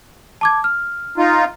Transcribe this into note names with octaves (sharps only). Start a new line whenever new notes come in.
A5 D6 G#6
F6
D#4 F4